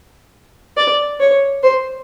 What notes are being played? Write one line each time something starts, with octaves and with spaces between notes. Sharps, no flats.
D5
C#5
C5